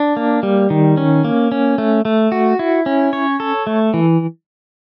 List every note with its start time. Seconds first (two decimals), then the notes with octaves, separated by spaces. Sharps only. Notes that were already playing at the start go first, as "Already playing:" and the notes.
Already playing: D4
0.17 A#3
0.43 G3
0.70 D#3
0.97 C#4
1.25 A#3
1.52 C#4
1.78 A3
2.05 A3
2.32 F#4
2.59 E4
2.86 C#4
3.13 C#5
3.40 A4
3.67 A3
3.94 E3